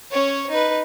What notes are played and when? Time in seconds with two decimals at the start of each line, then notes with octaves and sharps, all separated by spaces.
0.11 C#4 C#5
0.50 D#4 B4